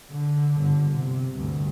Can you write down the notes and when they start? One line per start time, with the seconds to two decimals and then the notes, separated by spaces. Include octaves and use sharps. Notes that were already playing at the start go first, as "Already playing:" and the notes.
0.12 D3
0.57 G1 D3
0.91 C3
1.37 D2 G2